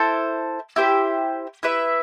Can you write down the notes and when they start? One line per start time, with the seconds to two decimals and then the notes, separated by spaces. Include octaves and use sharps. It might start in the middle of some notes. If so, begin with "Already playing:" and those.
Already playing: E4 A4 C5
0.76 E4 G4 C5
1.63 E4 B4 E5